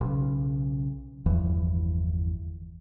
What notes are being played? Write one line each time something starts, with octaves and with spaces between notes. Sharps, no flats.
B1 C#3
G1 E2 E3 F3